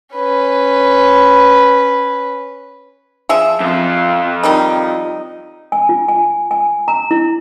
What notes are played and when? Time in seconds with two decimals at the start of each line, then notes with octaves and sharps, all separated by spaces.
0.14 C#4 B4
3.29 F3 G#4 E5
3.61 F2 F4
4.43 D#3 G3 D#4
5.72 G#5
5.89 F4
6.08 G#5
6.51 G#5
6.88 A#5
7.11 E4